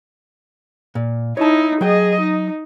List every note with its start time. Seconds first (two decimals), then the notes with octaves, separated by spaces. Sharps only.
0.95 A#2
1.37 D#4 E4 C#5 A5
1.81 F#3 G#4 D#5 G5
2.21 D#4